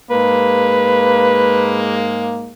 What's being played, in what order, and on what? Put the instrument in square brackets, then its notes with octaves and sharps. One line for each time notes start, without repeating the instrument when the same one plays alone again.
[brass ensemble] G#2 G#3 A#3 [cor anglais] B4